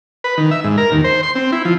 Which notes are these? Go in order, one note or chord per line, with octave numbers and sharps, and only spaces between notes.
B4
D#3
E5
G#2
A#4
D#2
C5
C6
C4
E4
F3